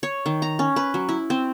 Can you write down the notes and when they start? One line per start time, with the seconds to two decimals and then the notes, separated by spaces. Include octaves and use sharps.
0.03 C#5
0.26 D#3
0.42 A#5
0.59 C#4
0.76 B4
0.94 F#3
1.09 E4
1.30 C4